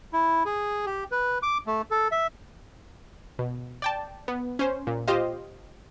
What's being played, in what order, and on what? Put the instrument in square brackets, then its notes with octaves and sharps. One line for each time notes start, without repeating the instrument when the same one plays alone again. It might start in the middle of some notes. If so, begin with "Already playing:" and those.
[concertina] E4
G#4
G4
B4
D6
A3
A4
E5
[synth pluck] B2
D5 G5 A5
B3
C#4 C5
A#2
F4 G4 C5 D#5 F5